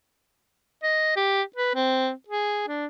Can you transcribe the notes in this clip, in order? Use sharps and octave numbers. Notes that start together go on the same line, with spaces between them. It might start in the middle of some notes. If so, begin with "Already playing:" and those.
D#5
G4
B4
C4
G#4
D4